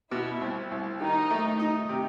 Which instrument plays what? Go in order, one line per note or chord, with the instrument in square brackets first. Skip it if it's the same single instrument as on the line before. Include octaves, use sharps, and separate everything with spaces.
[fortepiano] B2 [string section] E4
[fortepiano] C2
C2
[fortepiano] D#3 [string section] D#4
[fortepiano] A3
D#4
C3